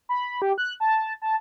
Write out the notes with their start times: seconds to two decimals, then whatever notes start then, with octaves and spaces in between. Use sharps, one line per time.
0.09 B5
0.42 G4
0.58 F#6
0.80 A5
1.22 A5